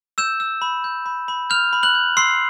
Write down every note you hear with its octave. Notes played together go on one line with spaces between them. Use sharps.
E6 G6 E7
E6
B5
G6
B5
B5
F6 G6 F7
B5
F#6 F#7
G6
C6 E6 C7